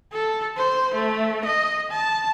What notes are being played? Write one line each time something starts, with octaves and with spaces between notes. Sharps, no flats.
A4
C5
A3
D#5
A5